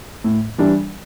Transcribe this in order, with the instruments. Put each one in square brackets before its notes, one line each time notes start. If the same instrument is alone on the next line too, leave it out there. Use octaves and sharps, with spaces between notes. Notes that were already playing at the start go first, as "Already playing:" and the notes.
[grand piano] A2
E3 G3 D4